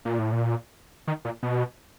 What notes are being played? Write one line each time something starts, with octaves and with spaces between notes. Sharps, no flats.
A#2
A2
A#2
D#3
A#2
B2